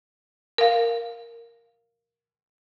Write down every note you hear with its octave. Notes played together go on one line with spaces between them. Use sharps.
A#4 F5